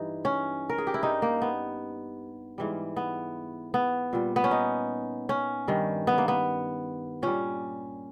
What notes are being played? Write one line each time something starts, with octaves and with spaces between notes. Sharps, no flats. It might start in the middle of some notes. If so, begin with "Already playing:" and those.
Already playing: G2 E3 G3 D#4
C#4
A#4
G#4
G4
E4
G2 G3 D#4
A#3
B3
G#2 E3 G3
B3
B3
A#2 G3
B3
C#4
D#4
C#4
G2 D#3 G3
B3
A#3
B3
A#2 G3 C#4